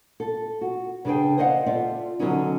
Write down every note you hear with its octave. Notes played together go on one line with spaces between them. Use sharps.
A4
F#4
C#3 D4 G#4 B4 G5
C5 D5 D#5 F5 F#5
F4 A4 D5 E5
D3 F#3 B3 C#4 D#4